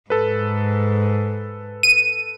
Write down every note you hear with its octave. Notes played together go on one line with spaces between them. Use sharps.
G#2 A4 B4
D#7